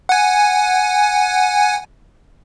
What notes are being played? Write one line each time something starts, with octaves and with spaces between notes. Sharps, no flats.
F#5 G#5